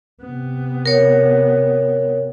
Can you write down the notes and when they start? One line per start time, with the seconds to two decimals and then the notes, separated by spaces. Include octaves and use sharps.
0.21 C3 B3
0.86 A#4 C#5